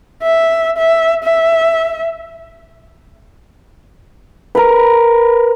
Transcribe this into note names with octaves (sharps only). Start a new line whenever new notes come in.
E5
E5
E5
A#4 B4